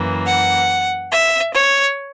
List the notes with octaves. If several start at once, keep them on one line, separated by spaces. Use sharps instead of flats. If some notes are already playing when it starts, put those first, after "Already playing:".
Already playing: F#2 E3 A#3
F#5
E5
C#5